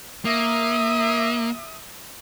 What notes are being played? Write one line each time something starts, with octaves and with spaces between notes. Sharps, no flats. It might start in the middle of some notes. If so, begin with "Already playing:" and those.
A#3 E5 D#6